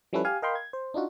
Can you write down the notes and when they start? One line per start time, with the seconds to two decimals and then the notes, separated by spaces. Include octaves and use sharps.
0.13 F3 G3 C#4 E4 A4 B4
0.25 G4 F5 G#5
0.42 A#4 D#5 F5 G5 B5 C6
0.55 G#6
0.73 C5
0.94 D4 D#4 F4 F#4